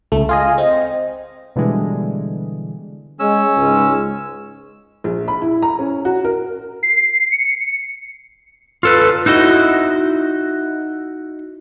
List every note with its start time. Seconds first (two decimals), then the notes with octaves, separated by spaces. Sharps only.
0.12 C#2 A3
0.29 F4 G#4 D#5
0.58 C4 D#5
1.56 B2 D3 E3 G3 G#3
3.20 G#3 C#4 E6
3.58 C#2 G#2 G#3
5.04 A#1
5.28 B5
5.42 E4
5.62 A#5
5.79 C#4
6.05 F#4
6.25 A#4
6.83 C7
7.31 C#7
8.83 F4 A4 B4
9.26 D#4 E4 F#4 D#5